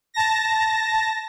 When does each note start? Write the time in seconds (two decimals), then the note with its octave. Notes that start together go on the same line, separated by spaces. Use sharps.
0.14 A5 A#6